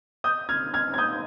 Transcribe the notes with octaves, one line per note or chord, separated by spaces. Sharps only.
D#6 G6
F6 G#6
F6 G#6
G#6
D#6 G6